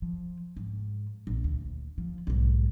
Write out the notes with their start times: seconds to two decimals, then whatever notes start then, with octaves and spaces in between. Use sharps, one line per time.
0.02 F3
0.57 G#2
1.27 A#1
1.44 D2
1.98 F3
2.27 B1 G#2